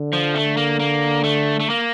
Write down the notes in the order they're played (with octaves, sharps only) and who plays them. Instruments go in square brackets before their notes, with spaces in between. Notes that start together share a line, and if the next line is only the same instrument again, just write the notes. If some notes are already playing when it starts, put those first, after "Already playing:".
Already playing: [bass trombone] D3
[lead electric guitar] F3
A3
A#3
A#3
A3
A3
A#3